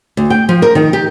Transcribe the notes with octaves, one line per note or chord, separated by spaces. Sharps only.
D2
G5
F3
A#4
D#3
G4